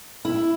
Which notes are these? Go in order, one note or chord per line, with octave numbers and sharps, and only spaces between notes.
E4